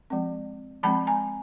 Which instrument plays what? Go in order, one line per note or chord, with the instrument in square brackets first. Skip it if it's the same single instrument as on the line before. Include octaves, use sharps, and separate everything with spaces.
[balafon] F3 G#3 C4
F3 G#3 C4 A5 B5
G#5 A#5